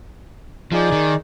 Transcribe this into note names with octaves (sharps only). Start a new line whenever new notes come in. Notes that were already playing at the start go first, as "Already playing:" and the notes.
F3 D#4 G#4 D5
D#3